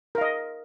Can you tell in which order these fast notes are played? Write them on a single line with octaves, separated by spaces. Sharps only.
A#4 F5 D#5